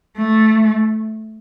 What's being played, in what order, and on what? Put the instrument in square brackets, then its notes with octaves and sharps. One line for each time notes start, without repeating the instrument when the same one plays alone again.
[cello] A3